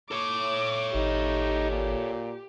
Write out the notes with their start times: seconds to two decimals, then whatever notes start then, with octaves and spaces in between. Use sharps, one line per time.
0.11 A4 C#5 D6
0.94 G#1 D#4 G4
1.71 A#2